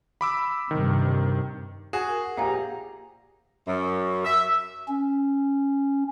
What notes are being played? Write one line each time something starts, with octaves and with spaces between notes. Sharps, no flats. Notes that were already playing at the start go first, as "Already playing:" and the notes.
B5 D6 E6
G2 C3 D#3
F#4 G#4 G#5 E7
A#4
A#1 G4 F5 F#5 G#5 A#5
F#2
E5
C#4